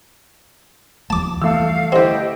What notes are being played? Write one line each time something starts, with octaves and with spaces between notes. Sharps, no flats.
D#2 F3 A3 A5 D6
E3 G3 A3 F5 E6
D3 C4 E4 G4 D#5